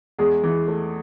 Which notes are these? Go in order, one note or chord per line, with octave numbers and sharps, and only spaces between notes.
E2 G#3 G#4
E3
A3